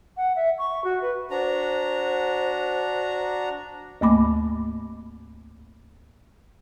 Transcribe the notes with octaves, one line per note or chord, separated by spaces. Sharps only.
F#5
E5
C#6
F#4
B4
D4 F#4 C5 A#5
D2 G#2 A3 A#3 B5 D6